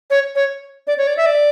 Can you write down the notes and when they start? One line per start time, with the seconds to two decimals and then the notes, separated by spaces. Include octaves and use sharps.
0.10 C#5
0.35 C#5
0.87 D5
0.98 C#5
1.07 D5
1.17 E5
1.26 D5